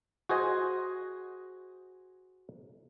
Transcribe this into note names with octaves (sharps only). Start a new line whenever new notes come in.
F#4 G#4 C5 D#5 G#5